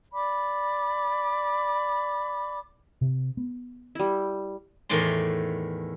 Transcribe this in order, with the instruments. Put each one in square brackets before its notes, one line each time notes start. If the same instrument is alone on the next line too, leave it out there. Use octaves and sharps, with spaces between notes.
[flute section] D5 B5 D6
[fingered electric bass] C3
B3
[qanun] G3 E4
[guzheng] E2 A2 D#3 D5 C6